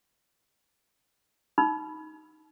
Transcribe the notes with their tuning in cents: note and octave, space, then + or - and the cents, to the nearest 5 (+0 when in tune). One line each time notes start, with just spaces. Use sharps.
D#4 +0 B5 +0